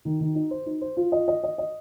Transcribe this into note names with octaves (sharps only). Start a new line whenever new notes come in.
D#3
D#3
D#4
C5
D#4
C5
F4
D#5
D#5
D#5
D#5